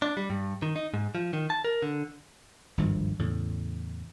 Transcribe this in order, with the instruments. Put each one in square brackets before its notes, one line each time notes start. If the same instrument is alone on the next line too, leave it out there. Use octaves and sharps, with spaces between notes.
[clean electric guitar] D4
G3
G2
D#3
D#4
G#2
F3
D#3
A5
A#4
D3
[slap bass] G#1 D2 G2 F3
E2 A2 C#3